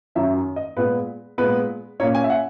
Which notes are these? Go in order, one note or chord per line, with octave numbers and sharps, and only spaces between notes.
F#2 D#3 F#3 C#4 E5
D#5
A#2 G#3 B3 B4
A#2 G#3 B3 B4
A#2 A#3 C#4 C#5
G#5
E5
F#5